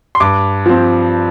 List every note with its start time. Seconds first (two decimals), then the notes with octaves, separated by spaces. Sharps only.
0.15 C6
0.20 G2 D6
0.66 F3 C4